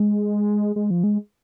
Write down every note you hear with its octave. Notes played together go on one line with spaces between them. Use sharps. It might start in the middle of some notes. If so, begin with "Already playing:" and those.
Already playing: G#3
G#3
F3
G#3